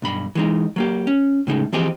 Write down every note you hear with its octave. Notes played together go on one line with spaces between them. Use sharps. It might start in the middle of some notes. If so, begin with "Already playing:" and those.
B1 G2 B5
E3 G#3 D#4
F#3 A#3 G4
C#4
A2 C#3 G#3 D#4
E3 F3 C4 G4 G#4 D#5